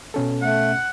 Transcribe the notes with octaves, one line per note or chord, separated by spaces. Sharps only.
B2 C#4 A4
A3 F#5